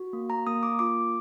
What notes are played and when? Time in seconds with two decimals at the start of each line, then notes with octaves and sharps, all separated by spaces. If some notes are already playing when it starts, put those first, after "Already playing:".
Already playing: F#4
0.13 A#3
0.30 A#5
0.47 A#3 D#6
0.63 D6
0.79 F4 D6